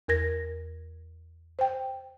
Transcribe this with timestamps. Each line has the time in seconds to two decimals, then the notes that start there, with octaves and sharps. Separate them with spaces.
0.08 E2 A#4 G#6 A#6
1.59 C5 G5